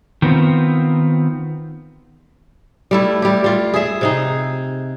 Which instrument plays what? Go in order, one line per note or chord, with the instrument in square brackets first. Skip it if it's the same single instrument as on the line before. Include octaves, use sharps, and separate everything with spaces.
[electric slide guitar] D#3 B3 C4 F4
[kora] G3 A3 E4
G3 G4
G3 F4
G#4 E5
C3 D#4 G#4